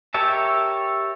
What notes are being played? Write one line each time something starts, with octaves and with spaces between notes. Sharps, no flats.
G4 A#4 C#5 E5 A5